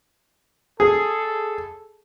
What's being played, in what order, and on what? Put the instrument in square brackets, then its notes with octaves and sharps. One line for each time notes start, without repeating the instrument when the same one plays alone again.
[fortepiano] G#4 [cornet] A4